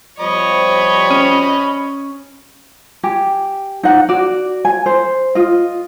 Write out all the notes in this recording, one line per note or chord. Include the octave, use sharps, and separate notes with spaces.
F3 G3 C#5 D#5 B5
C#4
G4 G#5
D#4 F#5
F#4 D5
G#5
C5
F4 D#5